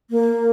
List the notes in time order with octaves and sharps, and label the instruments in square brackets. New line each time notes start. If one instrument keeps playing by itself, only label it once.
[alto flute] A#3